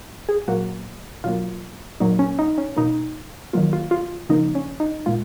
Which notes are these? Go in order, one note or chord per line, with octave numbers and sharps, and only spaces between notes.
G#4
A#2 F#3 A#3 F#4
B2 F#3 A#3 F4
A#2 F#3 A#3 D#4
C#4
D#4
C#4
B2 A#3 D#4
D#3 F#3 A#3 F4
F4
F4
C#3 F3 A#3 D#4
C#4
D#4
A#2 G#3 F4